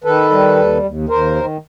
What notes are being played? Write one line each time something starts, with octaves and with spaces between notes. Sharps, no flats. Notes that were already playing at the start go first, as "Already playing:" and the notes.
D#3 A4 B4
G3
D#2
D#2
D#2 A#4 C5
D#3